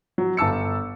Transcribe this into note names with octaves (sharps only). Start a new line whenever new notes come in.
F#3
G1 A5 E6 C#7